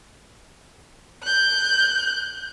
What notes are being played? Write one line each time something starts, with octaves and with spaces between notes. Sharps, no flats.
F#6 G6